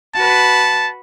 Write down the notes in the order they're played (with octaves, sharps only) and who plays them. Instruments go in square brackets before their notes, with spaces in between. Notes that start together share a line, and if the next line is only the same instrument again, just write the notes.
[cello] F#4 B4 [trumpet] A5